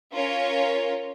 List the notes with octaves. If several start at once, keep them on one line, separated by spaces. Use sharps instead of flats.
C#4 F4 A#4 C#5